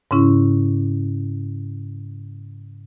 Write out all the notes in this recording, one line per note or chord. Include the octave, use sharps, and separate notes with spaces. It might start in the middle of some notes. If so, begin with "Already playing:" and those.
G#2 C#3 C#4 E4